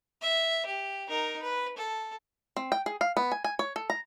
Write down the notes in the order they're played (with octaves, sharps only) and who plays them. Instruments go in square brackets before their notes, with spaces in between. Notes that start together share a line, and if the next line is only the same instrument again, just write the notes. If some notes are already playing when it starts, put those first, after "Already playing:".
[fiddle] E5
G4
D#4 A#4
B4
A4
[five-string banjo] C4
G5
G#4
F5
B3
G#5
G#5
C#5
A4
A#5